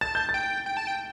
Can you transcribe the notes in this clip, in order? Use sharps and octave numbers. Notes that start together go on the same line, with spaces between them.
A5 A6
G6
A6
G5
G5
A5
G5